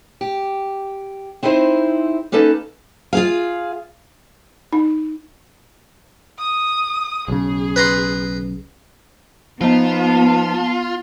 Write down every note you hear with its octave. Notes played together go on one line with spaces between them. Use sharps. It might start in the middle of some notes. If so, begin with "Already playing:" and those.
G4
C4 D#4 E4 G#4 C5
A#3 C#4 D#4 A4 B4
F4 G#4 F5
D#4
D#6
B1 C#3 G#4
B4 A#5 C6
F3 B3 D#4 F4 A5